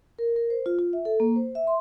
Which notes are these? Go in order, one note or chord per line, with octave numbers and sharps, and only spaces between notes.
A#4
A#4
C5
F4
F4
E5
A4
A#3
C5
E5
C6